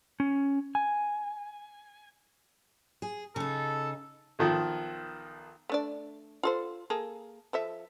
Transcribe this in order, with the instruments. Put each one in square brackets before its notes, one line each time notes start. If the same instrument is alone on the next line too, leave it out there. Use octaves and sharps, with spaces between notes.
[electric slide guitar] C#4
G#5
[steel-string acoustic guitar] G#4
[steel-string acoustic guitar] C#3 D#4 [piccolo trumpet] A4
[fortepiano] B1 D#3 F3
[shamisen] A3 D4 D5
F4 A4 C5
A#3 G#4 A4
F3 A4 E5